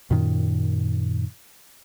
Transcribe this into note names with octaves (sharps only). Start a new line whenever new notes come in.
F#2 A#2 D#3